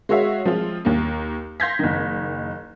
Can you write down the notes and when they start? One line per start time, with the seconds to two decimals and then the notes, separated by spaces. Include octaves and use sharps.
0.09 G#3 F#4 C#5 E5 F5
0.45 F3 G#3 C4 F4
0.85 D#2 A#3
1.60 F5 C6 G6 G#6 A#6 B6
1.79 F#1 D#3